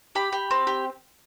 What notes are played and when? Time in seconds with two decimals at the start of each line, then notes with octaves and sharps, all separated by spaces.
0.15 G4 B5
0.33 G4
0.51 C4
0.67 G4